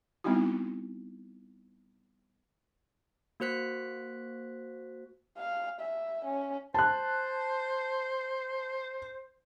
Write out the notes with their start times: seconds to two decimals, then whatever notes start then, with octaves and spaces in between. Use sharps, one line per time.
0.24 G3 B3 C4 D#4 E4 F#4
3.40 A#3 F#4 C5 F#6 B6
5.38 F5
5.80 E5
6.25 C#4
6.74 C5 A5 F#6